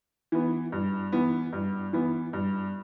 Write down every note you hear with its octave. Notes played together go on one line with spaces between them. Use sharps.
E3 B3
G2
E3 B3
G2
E3 B3
G2